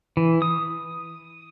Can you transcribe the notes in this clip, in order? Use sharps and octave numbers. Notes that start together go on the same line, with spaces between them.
E3
D#6